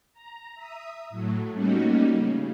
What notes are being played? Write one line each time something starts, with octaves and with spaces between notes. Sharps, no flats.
A#5
E5 D#6
A2 F#3 A3
G3 A3 A#3 C#4 D#4 F#4
C#3